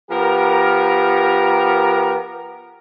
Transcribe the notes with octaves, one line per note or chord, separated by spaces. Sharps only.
F3 B3 G4 A#4